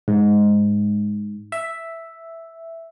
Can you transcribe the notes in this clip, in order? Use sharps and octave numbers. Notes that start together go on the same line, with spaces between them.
G#2
E5